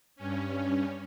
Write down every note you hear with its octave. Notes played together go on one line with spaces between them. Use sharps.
G2 C#4